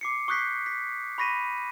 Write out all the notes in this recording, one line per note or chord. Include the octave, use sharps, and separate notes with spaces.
D6 C7 C#7
C#6 D#6 F#6 G6 B6 C7
B6
B5 C#6 A#6 B6 D#7